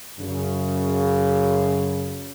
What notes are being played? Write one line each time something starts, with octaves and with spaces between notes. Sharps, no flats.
F#2 C#3